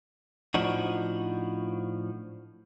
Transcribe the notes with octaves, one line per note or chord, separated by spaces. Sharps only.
A2 F3 D4 D#4 F#4